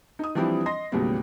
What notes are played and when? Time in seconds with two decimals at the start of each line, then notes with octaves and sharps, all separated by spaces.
0.19 D#4 D#6
0.35 E3 F3 G3 C4 D4 E4
0.66 D#5 C6 A#6
0.92 D#2 A2 C#3 F#3 G3 B3